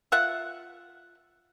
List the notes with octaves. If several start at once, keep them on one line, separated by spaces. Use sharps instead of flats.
F4 E5 F#5